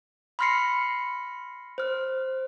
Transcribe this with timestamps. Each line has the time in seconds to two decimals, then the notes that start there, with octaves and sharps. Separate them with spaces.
0.39 B5 C6 F6 A#6 C7 C#7
1.78 C5 F6